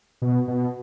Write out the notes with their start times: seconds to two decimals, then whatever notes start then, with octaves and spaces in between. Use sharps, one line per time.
0.22 B2
0.48 B2